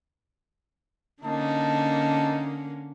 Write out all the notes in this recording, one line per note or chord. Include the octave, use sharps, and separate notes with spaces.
D3 A#3 C#4 D#4 A5